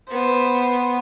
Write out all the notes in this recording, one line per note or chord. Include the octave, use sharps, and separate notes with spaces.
B3 C5